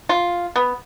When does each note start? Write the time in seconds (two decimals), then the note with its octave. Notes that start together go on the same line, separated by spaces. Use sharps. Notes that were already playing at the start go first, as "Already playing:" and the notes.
0.09 F4
0.56 B3